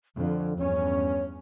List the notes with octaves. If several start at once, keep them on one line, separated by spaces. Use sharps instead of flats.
F2 D3
E2 G2 C#4 C#5